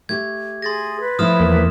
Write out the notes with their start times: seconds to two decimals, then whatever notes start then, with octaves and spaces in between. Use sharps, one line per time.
0.09 A3 G4 G#6
0.62 G#4 C6 A6 A#6
1.00 B4
1.19 F3 A3 E4 D#6 F6 E7
1.40 E2 A#3